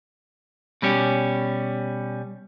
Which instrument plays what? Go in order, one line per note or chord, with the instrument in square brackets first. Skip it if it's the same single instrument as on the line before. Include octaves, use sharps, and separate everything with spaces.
[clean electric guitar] B2 G3 C#4 G4